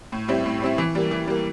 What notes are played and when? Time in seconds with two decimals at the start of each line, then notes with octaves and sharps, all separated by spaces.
0.12 A2
0.28 G3 C4 E4
0.46 A2
0.62 G3 C4 E4
0.78 E3
0.95 G3 A#3
1.11 E3
1.27 G3 A#3